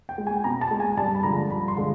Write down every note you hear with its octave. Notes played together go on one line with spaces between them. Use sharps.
G5
G#3
G#5
B2 A#5
A5
G#3
G#5
G2 A5
B5
D3 F3 G#3 A#5
G2 B5
C6
D3 F3 G#3